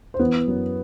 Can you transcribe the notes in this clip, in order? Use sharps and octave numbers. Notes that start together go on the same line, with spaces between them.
C5
E3 B3 B4
F#2